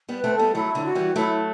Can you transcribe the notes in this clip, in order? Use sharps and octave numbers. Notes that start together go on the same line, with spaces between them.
G3 B3
B4
A3 C4
G3 B3 A4
F#3 A3 E4
D3 F#3
F#4
E3 G3
F#3 A3 E4